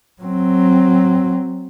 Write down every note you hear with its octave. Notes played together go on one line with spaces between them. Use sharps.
F#3 C4